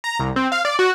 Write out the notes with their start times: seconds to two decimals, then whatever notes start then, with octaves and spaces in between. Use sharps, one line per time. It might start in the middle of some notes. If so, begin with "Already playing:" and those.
0.04 A#5
0.20 C2
0.36 C4
0.52 F5
0.65 D5
0.79 F#4